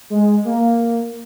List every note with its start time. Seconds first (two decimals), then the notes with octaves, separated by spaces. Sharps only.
0.10 G#3
0.45 A#3